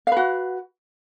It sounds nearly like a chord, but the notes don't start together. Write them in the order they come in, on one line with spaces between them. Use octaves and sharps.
F5 B4 F#4